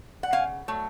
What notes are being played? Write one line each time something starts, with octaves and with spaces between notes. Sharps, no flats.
F#5
C#3 F5 G#5
F#3 A3